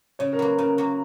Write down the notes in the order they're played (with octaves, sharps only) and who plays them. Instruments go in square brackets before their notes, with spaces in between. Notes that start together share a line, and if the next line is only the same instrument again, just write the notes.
[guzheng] C#3 [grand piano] C#5
[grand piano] A#4
[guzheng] F#3 A#3 [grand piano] B4
[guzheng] C#3 [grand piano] A#4
[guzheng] F#3 A#3